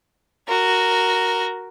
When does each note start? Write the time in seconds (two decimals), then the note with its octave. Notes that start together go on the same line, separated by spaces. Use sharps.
0.48 F#4 A#4